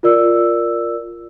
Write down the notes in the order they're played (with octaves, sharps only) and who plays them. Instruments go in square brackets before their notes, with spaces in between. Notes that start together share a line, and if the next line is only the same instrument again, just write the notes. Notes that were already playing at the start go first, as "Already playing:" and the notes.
[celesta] F4 A#4 D5 E6